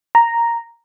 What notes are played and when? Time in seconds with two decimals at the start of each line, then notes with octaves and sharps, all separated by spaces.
0.15 A#5